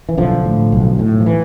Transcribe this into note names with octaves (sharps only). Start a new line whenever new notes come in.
E3
B1 D3 F3
A2
B1
A2
F3
E3